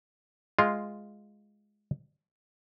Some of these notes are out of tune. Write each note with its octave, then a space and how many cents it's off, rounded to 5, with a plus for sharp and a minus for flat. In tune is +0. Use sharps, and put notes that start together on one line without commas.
G#3 +0 F4 +0